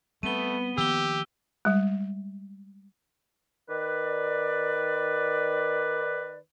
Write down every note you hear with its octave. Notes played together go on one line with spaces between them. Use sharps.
G3 A3 B3 C4 D#7 G7
D#3 F3 A#3 G4 E6 G7
G3 G#3
D#3 B4 D5